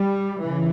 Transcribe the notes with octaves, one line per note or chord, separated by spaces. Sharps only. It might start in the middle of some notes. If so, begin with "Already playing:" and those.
Already playing: G3
C#3 E3